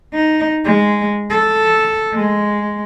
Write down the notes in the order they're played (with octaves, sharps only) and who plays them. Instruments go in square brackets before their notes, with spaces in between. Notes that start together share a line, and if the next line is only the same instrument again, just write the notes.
[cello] D#4
G#3
A4
G#3